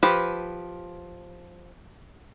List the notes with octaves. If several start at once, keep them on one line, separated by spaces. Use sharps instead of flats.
F3 G4 B4